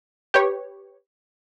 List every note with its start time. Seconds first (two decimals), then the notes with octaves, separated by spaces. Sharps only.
0.34 G4 B4 C#5